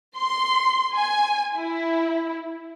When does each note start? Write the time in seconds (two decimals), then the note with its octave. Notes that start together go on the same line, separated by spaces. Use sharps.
0.18 C6
0.95 G#5
1.55 E4